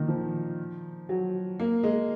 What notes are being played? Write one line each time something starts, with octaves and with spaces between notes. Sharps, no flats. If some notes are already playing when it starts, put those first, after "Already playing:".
Already playing: A#2 D#3
F3
F#3
A#3
G#3